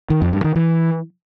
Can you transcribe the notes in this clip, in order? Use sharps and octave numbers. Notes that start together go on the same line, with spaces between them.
D#3
F2
G2
D#3
E3